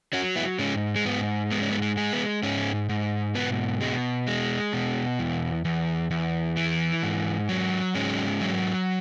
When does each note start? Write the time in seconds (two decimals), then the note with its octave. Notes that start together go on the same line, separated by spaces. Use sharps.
0.13 F#3 C#4 F#4
0.36 B3 E4
0.59 G#2 G#3 C#4
0.96 G#3
1.05 G#2 B3
1.51 G#3 B3
1.61 C#4
1.71 B3
1.82 G#3
1.97 G#3
2.13 B3
2.43 G#2 G#3 C#4
2.89 G#2
3.35 B2 B3
3.81 B2 G#3
4.27 G#3
4.73 B2
5.19 E2
5.65 E2
6.11 E2
6.57 E3
7.03 G#2
7.49 F#3
7.95 G#2 G#3 C#4
8.41 F#3